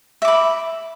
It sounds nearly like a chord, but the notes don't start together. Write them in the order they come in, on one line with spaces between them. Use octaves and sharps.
E5 D6 B5